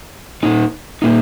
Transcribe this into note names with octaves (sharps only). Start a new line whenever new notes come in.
A#2 A#3 D#4
A#2 A#3 D#4